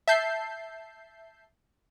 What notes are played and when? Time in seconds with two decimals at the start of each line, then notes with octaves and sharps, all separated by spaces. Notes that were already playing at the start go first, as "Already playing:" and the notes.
0.08 E5 A5 G6 C7